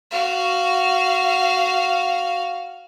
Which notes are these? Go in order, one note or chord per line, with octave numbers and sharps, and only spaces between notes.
F#4 F5